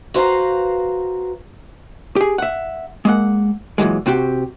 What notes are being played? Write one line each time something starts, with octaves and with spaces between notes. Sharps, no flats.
F#4 B4 C5 F5 G5 A#5
G4 G#4
E5 F#5
G#3 A#3 F#5
A#2 E3 F#3 G#3
C3 C4 F#4 G4